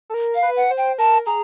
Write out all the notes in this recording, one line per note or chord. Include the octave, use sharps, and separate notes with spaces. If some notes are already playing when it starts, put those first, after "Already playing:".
A4
A#4
F5
B4
F#5
C5
G5
A#4 A5
G#4 A#5